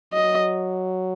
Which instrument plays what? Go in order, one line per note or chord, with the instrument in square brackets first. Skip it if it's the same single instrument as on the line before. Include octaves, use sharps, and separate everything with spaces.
[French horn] F#3 [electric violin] D#5